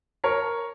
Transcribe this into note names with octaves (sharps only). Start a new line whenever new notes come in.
A#4 C#5